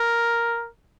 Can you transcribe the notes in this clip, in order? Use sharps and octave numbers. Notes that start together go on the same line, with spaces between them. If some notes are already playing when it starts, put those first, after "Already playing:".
Already playing: A#4